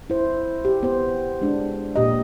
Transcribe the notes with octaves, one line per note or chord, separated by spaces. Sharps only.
E4 C5
G4
B3 C5
G#3 D4
A#2 G4 D#5